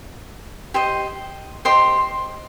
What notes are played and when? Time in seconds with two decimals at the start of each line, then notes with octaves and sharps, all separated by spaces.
0.74 G4 C5 D#5
1.65 G4 C5 D#5 C6